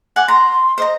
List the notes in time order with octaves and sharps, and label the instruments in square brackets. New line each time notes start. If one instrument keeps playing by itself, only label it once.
[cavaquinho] F#5 G#5 D6
[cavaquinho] A#5 [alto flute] C6
[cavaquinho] C5 D#5 A#5